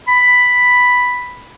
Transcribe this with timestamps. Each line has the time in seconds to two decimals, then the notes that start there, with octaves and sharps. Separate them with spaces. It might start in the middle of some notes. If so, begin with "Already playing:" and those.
0.08 B5